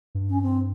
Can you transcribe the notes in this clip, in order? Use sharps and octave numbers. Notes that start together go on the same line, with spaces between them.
G2
C#4
C4